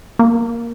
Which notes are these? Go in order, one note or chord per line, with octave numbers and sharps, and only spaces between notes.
A#3